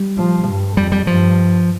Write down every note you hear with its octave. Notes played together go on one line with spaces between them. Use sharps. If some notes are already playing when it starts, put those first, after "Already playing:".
Already playing: G3
F3
G2
F2 G3
G3
G2 F3